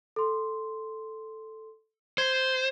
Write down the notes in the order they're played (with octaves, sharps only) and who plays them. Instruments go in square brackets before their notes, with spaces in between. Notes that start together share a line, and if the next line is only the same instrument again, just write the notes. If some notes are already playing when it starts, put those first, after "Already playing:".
[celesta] A4 C6
[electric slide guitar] C5 [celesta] G#6 C7